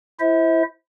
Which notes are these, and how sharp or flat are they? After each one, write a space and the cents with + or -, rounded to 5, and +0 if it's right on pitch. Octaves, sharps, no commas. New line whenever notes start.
E4 +15 C5 +0 E5 -35